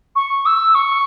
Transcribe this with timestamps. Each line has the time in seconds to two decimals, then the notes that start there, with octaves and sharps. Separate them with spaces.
0.16 C#6
0.46 E6
0.75 C#6